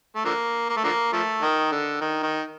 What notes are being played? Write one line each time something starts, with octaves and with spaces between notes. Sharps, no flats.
A3
D3 F3 A#3
A#3
A3
D3 F3 A#3
F3 A3
D#3
D3
D#3
D#3